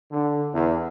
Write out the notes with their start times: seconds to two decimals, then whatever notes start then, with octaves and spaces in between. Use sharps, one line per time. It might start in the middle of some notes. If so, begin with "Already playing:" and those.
0.11 D3
0.53 E2